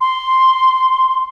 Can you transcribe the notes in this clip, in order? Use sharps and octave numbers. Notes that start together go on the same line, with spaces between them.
C6